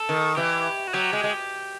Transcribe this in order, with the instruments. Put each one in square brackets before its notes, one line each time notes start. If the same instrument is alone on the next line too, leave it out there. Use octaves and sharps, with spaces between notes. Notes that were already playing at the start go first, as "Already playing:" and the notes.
Already playing: [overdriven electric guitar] A4
[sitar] D#3
[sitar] E3 [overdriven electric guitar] G4
[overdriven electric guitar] F#4
[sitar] F#3 [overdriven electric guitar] G4
[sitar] G#3
G#3